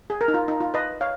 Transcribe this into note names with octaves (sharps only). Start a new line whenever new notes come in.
G#4
A#4
D#4
F4
D#4
F4
B4 D#5
C#5 F5